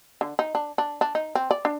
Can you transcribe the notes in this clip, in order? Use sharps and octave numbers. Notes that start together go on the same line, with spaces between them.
D3
D#4
D4
D4
D4
D#4
C4
D5
D4